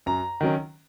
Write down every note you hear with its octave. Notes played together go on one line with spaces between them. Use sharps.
F#2 A#5
D#3 F#3 C#4